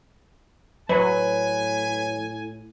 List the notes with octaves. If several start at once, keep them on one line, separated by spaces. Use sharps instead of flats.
A2 F#3 B4 G#5